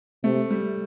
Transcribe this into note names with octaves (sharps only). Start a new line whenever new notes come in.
C3 A3
G3